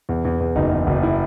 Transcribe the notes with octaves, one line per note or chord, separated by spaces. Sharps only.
E2
E2
E2
F#1 D#4
E2
F#1
E4